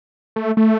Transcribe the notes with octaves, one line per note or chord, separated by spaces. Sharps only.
A3
A3